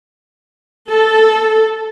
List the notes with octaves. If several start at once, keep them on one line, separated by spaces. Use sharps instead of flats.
A4